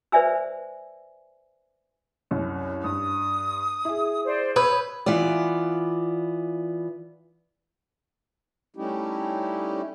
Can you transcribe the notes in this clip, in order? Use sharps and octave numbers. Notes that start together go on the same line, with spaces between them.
B4 C5 D5 E5 G#5 E6
C2 F#2
G2 D#6
E4 G#4
C5 D5
B4 C#5 D#6 E6 G6
E3 B3 F4 D5
G3 A3 C#4 D#4 E4 G4